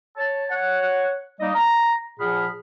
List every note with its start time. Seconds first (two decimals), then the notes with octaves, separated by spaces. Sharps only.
0.17 C#5 A5
0.50 C#5 F#5
1.40 G3 A#3 D#4 D#5
1.54 A#5
2.19 A#2 F3 G#4 F#5 B5 F6